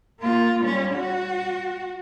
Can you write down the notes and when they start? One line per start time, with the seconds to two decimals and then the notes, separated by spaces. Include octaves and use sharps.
0.20 A#3 F4
0.64 G3 C#4
0.94 F#4